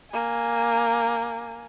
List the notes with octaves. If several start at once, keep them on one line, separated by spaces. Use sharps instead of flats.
A#3 G#5